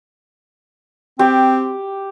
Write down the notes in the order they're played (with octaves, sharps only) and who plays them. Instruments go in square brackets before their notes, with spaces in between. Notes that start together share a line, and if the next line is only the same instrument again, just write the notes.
[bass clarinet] C4 [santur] G4